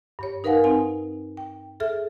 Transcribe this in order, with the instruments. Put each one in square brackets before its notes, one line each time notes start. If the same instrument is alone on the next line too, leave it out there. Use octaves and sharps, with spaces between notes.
[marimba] G2 G4 C#5
D#4 A#4 B4 F5 F#5 G#5
C4 D#4 G#5
G5
G#4 A4 E5 F6